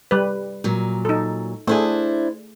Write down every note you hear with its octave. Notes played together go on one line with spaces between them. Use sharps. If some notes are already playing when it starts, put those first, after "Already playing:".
G3 B4
A#2 F#3
D#4 A4
A3 D4 E4 G#4 C5